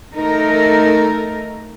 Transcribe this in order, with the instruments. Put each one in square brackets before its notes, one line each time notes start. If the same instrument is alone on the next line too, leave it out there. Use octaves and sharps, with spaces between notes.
[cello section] A3 D#4 A4 A#4